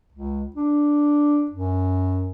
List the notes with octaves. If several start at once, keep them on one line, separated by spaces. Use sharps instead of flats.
C#2
D4
F#2